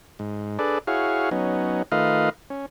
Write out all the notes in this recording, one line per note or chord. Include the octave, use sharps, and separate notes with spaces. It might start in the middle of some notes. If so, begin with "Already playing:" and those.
G#2
D4 G#4 A4 B4 D5
E4 F#4 G#4 C#5 F5
F#3 B3 C#4 D#4
D#3 A3 F4 B4 D#5 F5
C#4